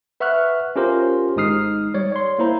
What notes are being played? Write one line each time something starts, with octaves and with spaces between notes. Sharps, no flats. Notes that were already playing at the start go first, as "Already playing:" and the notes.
B4 E5 F#5 C#6 F6 F#6
C#4 F4 G4 A#4 C5 C6
G#1 G#3 D#4 D#6 F6 C7
G3 C#5 D5
C#5 C6
A#3 E4 C5 A#5